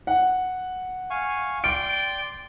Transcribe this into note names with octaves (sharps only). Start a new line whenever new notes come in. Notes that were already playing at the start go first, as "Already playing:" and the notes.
F#5
F5 G#5 C#6
D5 G5 C6 D7